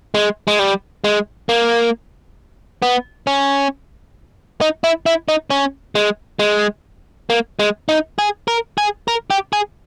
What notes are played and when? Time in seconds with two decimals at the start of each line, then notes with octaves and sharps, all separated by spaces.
0.14 G#3
0.48 G#3
0.59 G3
1.04 G#3
1.49 A#3
2.82 B3
3.27 C#4
4.61 D#4
4.84 E4
5.06 E4
5.28 D#4
5.50 C#4
5.95 G#3
6.39 G#3
7.30 A#3
7.59 G#3
7.89 D#4
8.19 G#4
8.48 A#4
8.78 G#4
9.08 A#4
9.30 G4
9.53 G#4